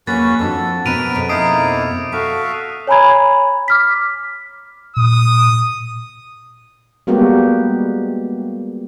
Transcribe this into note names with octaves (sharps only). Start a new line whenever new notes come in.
E2 A#3 C#4 F#4 B4 A6
F2 D4 F#4 A4
B2 B3 C4 A#4 B4 D7 D#7 F7
F2 B2 G#3
A#3 D#4 E4 D#6 C7 D7
F#4 A4 E5 F5
C#5 G#5 A#5 B5 G#6
D6 F6 B6
A#2 D#6
G3 G#3 A#3 B3 F#4 G4